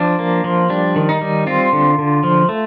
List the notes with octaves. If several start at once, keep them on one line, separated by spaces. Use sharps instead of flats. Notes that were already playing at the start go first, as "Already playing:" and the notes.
Already playing: F3 D4
A#3
F3
G3 D4
D#3
D#4
G3
C4 F4
D3
D3
F3
A3